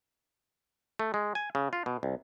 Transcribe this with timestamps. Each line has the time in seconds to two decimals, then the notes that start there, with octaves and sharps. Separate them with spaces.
0.99 A3
1.14 G#3
1.35 G#5
1.55 C#3
1.73 F4
1.86 B2
2.03 C2